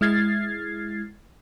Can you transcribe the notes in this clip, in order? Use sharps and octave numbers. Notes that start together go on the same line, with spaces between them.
G#3 E4 F6 G#6 A6 C7